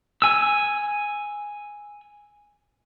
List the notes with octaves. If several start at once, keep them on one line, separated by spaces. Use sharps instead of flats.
G#5 E6